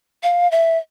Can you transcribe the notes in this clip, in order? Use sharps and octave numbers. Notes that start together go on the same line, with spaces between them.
F5
E5